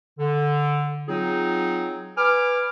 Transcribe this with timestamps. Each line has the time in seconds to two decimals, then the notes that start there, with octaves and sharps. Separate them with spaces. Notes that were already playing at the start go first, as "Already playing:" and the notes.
0.19 D3
1.08 F#3 C4 D#4 F4 G#4
2.16 B4 G#5 D6 F6